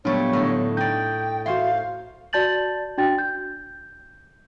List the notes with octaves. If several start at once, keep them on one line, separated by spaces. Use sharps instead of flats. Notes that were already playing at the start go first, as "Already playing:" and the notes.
A#2 F#3 G3 A3 B3 D4 C#5
A2 D3 D#4
D#4 D5 G5 G6
F#4 C5 C#5 E5 F5 C6
F#4 D5 A5 G6 A6 F#7
D4 F#4 G5 A6
G6